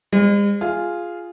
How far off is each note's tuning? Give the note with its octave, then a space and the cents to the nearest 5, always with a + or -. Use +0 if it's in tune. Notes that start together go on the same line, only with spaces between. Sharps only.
G#3 -45 C5 +5
F4 +0 G#4 +0